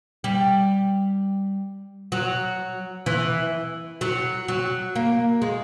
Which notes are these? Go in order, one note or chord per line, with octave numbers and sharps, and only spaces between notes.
G3
F#3
E3
F#3
F#3
A#3
G#3